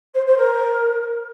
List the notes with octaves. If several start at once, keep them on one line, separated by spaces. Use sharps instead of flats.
C5
C5
A#4